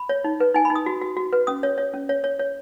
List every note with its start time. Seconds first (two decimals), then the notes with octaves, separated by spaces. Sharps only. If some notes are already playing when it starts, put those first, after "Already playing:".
Already playing: B5
0.09 C#5
0.24 D#4
0.40 B4
0.55 D#4 G#5
0.65 B5
0.70 D#4
0.75 D#6
0.86 F#4
1.01 F#4
1.17 F#4
1.33 B4
1.47 C#4 D#6
1.63 C#5
1.78 C#5
1.94 C#4
2.09 C#5
2.24 C#5
2.39 C#5